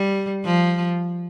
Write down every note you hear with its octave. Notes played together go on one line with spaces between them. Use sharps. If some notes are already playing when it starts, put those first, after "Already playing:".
Already playing: G3
F3